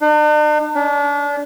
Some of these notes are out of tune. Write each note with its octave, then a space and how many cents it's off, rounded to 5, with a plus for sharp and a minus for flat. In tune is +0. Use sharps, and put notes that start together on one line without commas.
D4 +45
D4 -35